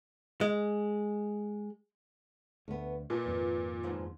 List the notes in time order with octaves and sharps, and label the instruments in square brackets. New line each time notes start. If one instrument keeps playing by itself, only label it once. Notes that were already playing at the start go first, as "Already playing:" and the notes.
[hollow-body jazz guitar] G#3
[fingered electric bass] D2 [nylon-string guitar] A3 B3
[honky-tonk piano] A#2 [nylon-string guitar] B4 D#5
[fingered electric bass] G#1 F2 A#3
[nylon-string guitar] E2 G#2 F3